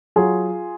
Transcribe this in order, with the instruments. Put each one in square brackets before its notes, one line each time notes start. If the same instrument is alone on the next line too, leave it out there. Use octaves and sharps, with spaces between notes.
[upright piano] F#3 F4 G#4